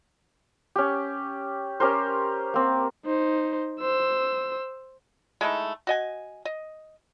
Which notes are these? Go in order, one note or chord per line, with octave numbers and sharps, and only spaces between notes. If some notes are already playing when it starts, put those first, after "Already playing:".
C#4 G4
C#4 G4 A#4 C5
A#3 C4
D#4 C5
C5 E6
G#3 A3 D#4 E4
F#4 D#5 G#5
D#5